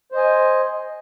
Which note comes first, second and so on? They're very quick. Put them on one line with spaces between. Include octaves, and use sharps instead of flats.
C5 D#5 G#5